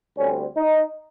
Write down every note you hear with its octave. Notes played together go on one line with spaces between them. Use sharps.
D2 D3 G3 C4 C#4
D#4